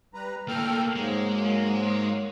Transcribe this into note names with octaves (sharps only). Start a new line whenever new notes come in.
G3 B4 A#5
A2 A#3 A4 G5 F6
G#2 F#3 G#3 A#3